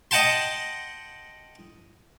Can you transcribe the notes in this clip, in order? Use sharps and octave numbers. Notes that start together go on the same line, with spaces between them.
D#5 F#5 G5 A5 C6